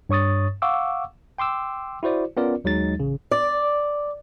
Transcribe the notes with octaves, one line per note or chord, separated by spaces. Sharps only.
G2 C#5 C#6 D#6 A6
F5 F#5 C#6 D6 E6
G5 C6 D6 E6
E4 F#4 C5 D5
B3 C#4 F4 A#4 D5
D#2 F#3 G#3 D#4 A6
A1 C#3
D5